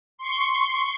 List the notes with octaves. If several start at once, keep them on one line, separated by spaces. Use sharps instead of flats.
C6 C#6